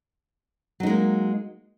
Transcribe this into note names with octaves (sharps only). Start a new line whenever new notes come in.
F#3 G#3 A#3 D#4